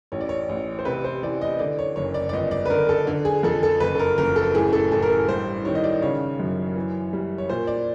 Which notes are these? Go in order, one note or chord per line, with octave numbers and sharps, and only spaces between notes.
A1 C#5
D5
C#5
A1
C5
C3 B4
C5
E3 D5
D#5
D3 D5
C#5
F#1 C#5
D5
D5
G1 D#5
D5
B4
D3 A#4
A4
D3
G#4
F2 A4
A4
F#1 B4
A4
A#4
F#1 A#4
A4
A2 G#4
A4
A1 A4
A#4
A4
G2 C5
D#3 C#5
D#5
D5
C#3 C#5
F#2
E3
G3
C#5
A#2 C5
D5